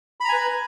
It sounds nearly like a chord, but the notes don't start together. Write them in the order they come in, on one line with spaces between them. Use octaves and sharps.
B5 A#5 G#5 B4